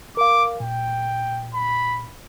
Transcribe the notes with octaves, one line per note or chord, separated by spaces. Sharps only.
A#4 F5 D6
A#2 G5
B5